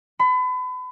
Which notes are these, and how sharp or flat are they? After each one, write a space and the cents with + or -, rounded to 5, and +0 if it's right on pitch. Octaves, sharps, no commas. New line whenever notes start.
B5 +35